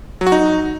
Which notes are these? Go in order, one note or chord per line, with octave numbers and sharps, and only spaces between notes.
F#3
F#4
D#4